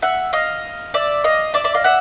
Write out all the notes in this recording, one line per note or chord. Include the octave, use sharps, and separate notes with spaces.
E5 F#5
D#5 F5
D5 E5
D#5 F5
D5 E5
D5 E5
D#5 F5
E5 F#5